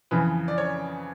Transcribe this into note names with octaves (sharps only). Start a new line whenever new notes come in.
F2 C#3 E3 B4
D5
C#5